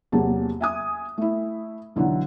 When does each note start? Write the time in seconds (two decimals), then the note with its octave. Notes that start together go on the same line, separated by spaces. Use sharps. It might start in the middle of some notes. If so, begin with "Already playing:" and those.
0.12 E2 C3 F#3 A#3 G#4 A5
0.61 E5 G#5 D#6
1.18 A3 E4
1.96 B1 D3 E3 F#3